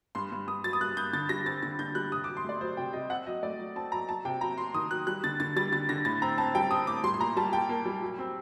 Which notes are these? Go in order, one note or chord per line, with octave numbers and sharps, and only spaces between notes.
G2 C6
G2
G2 D#6
F#3 A6
D#6
G2 F#6
G2 G6
D3 A6
G3 A#6
C4 A6
D3 A6
D3 G6
G3 F#6
C3 D#6
D6
F#3
C6
A3 D5
F#3 C5
C3 G5
C3 D#5
C4 F#5
F#3 D#5
A3 D5
F#3
C4 A5
F#3 A#5
F#3 A5
C3 G5
F#3 A#5
F#3 C6
D#3 D#6
F#3 F#6
G3 F#6
D3 A6
D3 A6
G3 A6
D3 A6
D3 A#6
A2 A6
C4 A#5
C4 A5
G3 G5
C4 D#6
A2 D6
G3 C6
C6
A#2 A#5
G3 A5
A#2 G5
A#3
G3
F#3
C4